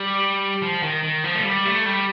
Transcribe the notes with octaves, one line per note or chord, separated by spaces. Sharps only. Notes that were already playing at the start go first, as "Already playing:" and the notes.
Already playing: G3
F3
D#3
D#3
F3
A3
G3
A3
G3